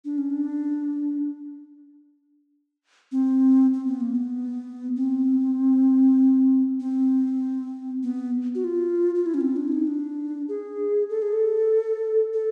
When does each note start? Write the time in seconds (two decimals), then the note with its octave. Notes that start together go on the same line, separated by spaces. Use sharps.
0.05 D4
0.18 C#4
0.30 D4
3.12 C4
3.74 C4
3.87 B3
4.01 A#3
4.15 B3
4.96 C4
6.80 C4
8.03 B3
8.55 F#4
8.64 F4
9.15 F4
9.26 E4
9.34 C#4
9.41 C4
9.56 D4
9.68 E4
9.72 D#4
9.87 D4
10.48 G#4
11.10 A4
11.22 G#4
11.33 A4
12.33 A4